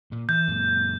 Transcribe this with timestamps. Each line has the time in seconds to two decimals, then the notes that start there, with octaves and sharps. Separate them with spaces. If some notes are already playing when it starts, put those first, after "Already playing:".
0.12 A#2
0.29 E3 G6
0.48 F#2 A#2